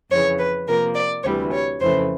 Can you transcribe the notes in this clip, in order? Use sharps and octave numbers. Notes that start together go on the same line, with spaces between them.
F2 C#3 E3 C#5
B4
C3 F3 A#3 A#4
D5
D2 C3 E3 G3 C#5
C#5
F2 C#3 E3 A3 C5